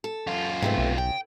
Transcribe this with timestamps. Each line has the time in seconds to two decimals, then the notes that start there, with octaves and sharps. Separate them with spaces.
0.04 A4
0.27 F#2 F4
0.62 G#2 C3 A3 B3
0.78 B1
0.98 C#3 G5